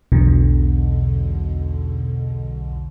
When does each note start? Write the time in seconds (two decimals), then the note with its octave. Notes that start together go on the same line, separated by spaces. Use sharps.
0.12 B1 E2 B2 D3